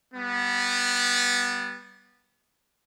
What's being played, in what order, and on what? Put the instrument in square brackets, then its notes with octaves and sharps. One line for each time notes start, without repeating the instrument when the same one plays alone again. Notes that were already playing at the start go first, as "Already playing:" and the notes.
[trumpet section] G3 B3